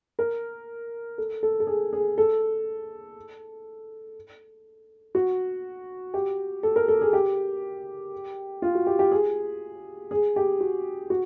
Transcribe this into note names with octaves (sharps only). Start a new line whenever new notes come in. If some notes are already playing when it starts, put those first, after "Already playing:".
A#4
A4
A4
A4
G#4
G#4
A4
F#4
G4
A4
A#4
A4
G#4
G4
F4
F#4
G4
G4
G#4
G#4
G4
F#4
F#4